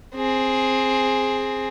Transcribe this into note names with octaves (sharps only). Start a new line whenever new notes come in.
C4 G#4